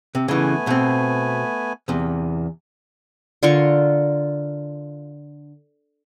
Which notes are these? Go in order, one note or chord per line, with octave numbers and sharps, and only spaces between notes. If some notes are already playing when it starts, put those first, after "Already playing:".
C3
C#3 E3 A3 B3 G#5
B2 C4
E2 C3
D3 F4 A#4 C#6